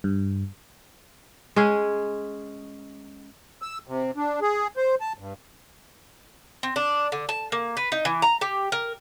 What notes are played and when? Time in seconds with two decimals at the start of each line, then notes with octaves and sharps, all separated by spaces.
0.04 G2
1.56 G#3 C#4 G#4
3.62 E6
3.88 C3
4.16 D4
4.42 G#4
4.77 C5
5.01 A5
5.19 G2
6.63 C4
6.76 D4
7.12 D3
7.29 A5
7.52 A#3
7.77 B4
7.92 D#4
8.05 E3
8.22 A#5
8.41 G4
8.72 A#4